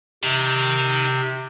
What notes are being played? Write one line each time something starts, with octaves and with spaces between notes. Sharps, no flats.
C3 D#3